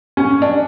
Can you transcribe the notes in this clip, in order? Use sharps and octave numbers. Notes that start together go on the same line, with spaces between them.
C#4
D4